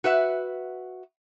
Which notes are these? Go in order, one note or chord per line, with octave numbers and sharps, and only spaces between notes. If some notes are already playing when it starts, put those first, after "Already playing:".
F#4 B4 E5 F#5